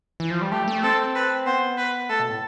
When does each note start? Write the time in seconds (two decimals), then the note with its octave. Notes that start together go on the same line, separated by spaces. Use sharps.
0.20 E3
0.31 F3
0.41 G3
0.52 A3 G4
0.68 A3
0.83 C4 A4
1.15 B4
1.46 B3 C5
1.77 B4
2.09 A3 A4
2.20 B2
2.30 A2